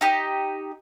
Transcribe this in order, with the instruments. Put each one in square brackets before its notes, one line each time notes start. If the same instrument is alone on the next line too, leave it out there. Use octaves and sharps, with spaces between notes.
[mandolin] D#4 G4 D#5